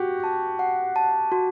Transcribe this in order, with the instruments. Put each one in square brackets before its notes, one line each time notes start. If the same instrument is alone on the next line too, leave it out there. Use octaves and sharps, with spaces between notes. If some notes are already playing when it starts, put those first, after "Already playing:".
Already playing: [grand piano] F#4 G4
[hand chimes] A5
F#5
A5
F#4